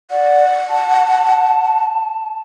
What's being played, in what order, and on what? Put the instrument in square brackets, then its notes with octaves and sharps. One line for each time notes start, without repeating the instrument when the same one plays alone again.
[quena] D5 [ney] F#5
[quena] A5